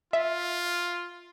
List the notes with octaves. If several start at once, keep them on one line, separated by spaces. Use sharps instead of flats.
F4 E5